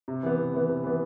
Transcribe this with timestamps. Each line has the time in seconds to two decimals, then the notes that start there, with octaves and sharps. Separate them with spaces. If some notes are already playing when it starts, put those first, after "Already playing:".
0.08 C3
0.23 E3 B3
0.38 C3
0.54 E3 B3
0.69 C3
0.84 E3 B3